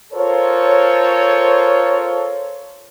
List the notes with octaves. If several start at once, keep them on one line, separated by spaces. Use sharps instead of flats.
F4 A4 A#4 C5 C#5